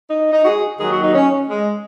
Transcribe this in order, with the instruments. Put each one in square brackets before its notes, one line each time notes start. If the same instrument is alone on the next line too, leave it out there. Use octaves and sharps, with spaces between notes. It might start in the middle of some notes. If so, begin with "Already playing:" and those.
[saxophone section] D#4
D#4
F#4
G#4
D#2 D#3 F#3 G#4
F#4
D#4
C#4
G#3